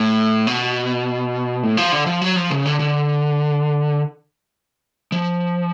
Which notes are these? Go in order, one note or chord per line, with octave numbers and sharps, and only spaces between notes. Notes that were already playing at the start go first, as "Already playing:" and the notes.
Already playing: A2
B2
A2
F3
D3
F3
F#3
F3
C#3
D3
D3
F3